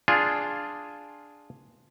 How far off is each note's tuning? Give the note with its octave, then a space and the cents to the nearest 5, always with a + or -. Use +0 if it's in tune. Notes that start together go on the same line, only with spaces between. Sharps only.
D4 +0 F4 +0 G#4 +0